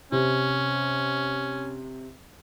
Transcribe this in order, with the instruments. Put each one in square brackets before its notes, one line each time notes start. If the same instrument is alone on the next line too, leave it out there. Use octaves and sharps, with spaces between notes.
[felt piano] C3 [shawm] C#4